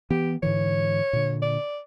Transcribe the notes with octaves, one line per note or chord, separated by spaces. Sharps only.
E3 B3 G4
G#2 D3 E3 C#5
A#2 D3
D5